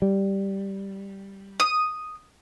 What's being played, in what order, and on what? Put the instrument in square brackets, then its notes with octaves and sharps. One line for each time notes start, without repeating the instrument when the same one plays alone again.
[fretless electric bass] G3
[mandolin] D#6